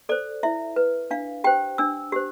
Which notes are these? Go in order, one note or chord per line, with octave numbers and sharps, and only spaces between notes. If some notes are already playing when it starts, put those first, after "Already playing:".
A4 C5 D5
E4 E5
B4
D4 F5
G4 C5 G5
D4 E6
G4 C5